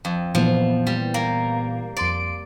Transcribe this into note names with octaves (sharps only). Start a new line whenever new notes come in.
F2
A#2 E3 F3 B3
G3
A#3
F2 D5 C6 D7